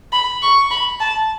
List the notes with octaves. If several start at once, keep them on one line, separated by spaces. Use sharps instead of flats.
B5
C#6
B5
A5